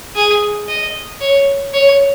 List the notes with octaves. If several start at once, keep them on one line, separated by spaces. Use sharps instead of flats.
G#4
D#5
C#5
C#5